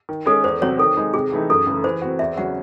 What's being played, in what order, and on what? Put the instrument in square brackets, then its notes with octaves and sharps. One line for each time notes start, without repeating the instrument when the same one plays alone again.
[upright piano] D#3
[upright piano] G#3 C#4 [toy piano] A4
[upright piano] E2 [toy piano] C5
[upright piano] C3 F#3 C4 F#4 [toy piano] C#5
[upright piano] D#3 [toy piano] A4
[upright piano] G#3 D#4
[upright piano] C3 [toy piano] G#4
[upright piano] E3 A3 D#4
[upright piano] F#2 [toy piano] A4
[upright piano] C#3 E3 A3
[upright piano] E3 [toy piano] C5
[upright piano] C4 F#4
[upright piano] E2 [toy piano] E5
[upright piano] C#3 F#3 C#4 F#4 [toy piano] F#5